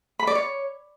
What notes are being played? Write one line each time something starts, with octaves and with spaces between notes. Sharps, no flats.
B5
D5
C#5